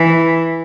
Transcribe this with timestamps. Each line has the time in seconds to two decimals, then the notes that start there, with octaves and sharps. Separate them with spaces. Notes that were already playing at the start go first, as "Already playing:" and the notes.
Already playing: E3